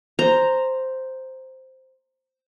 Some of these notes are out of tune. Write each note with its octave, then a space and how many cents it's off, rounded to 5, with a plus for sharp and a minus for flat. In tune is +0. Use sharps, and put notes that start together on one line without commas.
C5 +0 A#5 -5